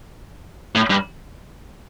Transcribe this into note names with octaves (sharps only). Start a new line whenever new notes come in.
A2
G2